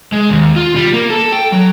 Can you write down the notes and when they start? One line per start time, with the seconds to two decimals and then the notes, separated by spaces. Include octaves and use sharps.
0.12 G#3
0.30 D#2
0.56 F4
0.76 G3
0.94 A#3
1.10 A4
1.33 G5
1.53 F#3